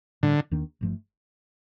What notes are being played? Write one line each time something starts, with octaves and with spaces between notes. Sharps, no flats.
A2 D3 G3 D4
D#2 D#3 A#3 D4
G1 G2 F3 A3